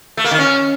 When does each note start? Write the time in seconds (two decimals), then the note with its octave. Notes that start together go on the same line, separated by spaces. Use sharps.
0.17 A3
0.24 A#3
0.31 D#3
0.38 C#4